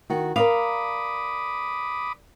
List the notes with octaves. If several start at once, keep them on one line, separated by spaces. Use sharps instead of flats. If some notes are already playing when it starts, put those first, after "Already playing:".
D#3 F#4
A#4 D5 F5 B5 D6 D#6